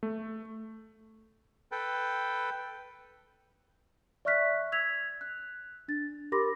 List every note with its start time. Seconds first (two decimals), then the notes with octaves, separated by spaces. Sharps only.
0.03 A3
1.72 A4 B4 G5
4.25 D5 E5 C#6 F6 F#6 B6
4.72 E6 G#6 B6 F7
5.21 F#6
5.88 D4 A6
6.32 G4 A#4 B5 C6 D6 A#6